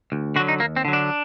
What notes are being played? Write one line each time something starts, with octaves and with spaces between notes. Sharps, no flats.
D2
D3 F#3 F#4
D#4
D#2 A#3
C4
D3 F#3
D4